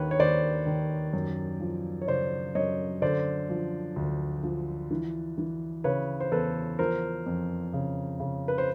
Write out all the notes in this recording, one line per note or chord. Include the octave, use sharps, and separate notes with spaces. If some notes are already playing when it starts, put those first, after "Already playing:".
Already playing: D#2 D#3 B4 C#5
C#5
D#2 C5 D5
D#3
F#2
F3
C#5
C#3 C5 D5
F#2 C#5 D#5
D3 C5 D5
F3
D2
F3
E3
E3
C#3 B4 C#5
C5
E2 A4 B4
F3 A#4 C5
F2
C#3
C#3
B4
C5